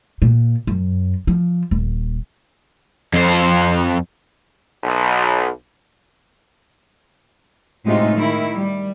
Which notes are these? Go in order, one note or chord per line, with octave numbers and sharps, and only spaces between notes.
A#2
F#2
F3
D#1
F2 C5
B1
A2 C3 G#3 A3 D#4 F4
D#3 E4
G3